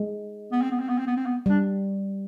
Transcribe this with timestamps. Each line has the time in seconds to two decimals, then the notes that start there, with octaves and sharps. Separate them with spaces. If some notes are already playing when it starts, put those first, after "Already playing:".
Already playing: G#3
0.52 B3
0.62 C4
0.71 B3
0.80 C4
0.89 B3
0.98 C4
1.07 B3
1.17 C4
1.26 B3
1.46 G3 D4